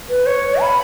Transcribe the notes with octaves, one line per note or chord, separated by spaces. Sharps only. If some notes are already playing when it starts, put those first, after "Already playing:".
B4
C#5
B5